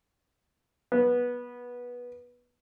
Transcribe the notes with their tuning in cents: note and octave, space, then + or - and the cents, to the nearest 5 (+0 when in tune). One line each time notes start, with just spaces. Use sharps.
B3 -15